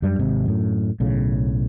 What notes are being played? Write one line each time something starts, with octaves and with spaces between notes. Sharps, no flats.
F#2 G3 D4
G#1 C3 G#3
F#2 A2
B1 A2 C#3